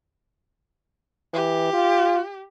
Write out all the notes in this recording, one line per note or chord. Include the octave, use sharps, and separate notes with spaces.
E3 G4
F4